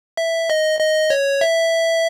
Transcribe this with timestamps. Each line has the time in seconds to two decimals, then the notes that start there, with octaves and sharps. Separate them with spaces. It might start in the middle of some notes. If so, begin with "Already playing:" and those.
0.17 E5
0.50 D#5
0.80 D#5
1.10 C#5
1.41 E5